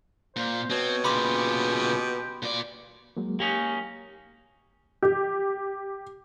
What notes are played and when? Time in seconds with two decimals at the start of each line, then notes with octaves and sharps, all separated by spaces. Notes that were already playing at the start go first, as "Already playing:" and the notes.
0.36 A#2 C5
0.70 B2 C4 C#5
1.05 A#2 C#3 G4 B5 C6 D6
2.42 A#2 D5
3.17 F#3 G#3 A#3
3.40 A#3 C#4 D#4 G4
5.03 G4